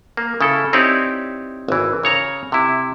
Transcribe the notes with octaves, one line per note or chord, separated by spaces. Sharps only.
A#3
C#3 E4 A4
C4 D#4 E4 G4 C#5 D5
G#1 E3
C#3 C#5 A#5
C3 E4